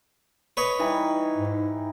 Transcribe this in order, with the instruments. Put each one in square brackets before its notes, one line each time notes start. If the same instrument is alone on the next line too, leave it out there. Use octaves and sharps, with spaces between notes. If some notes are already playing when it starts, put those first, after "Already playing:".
[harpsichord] B4 C#5 D#5
[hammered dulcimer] E3 G3 D#4
[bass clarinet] G#2